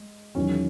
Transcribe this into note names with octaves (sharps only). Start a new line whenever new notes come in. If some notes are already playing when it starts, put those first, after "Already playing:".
Already playing: G#3
E1 E2 D#3 F#3 C#4